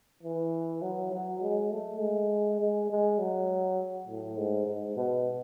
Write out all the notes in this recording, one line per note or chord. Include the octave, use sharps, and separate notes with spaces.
E3
F#3
F#3
G#3
A3
G#3
G#3
G#3
F#3
A2
G#2
G#2
B2